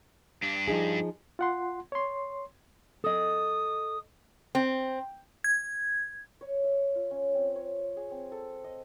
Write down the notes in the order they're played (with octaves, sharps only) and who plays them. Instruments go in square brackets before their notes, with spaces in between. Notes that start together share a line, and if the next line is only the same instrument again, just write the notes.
[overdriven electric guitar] G2 D4
[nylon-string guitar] F3 D#4 G#4
[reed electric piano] F4 F#5 C6
C#5 C6
[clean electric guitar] A4 D#5 [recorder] D#6
[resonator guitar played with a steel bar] C4
[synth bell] G#6
[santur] C#5
E5
F4
C#4
C4
C#5
C#5
G#4
C4
A4
D#5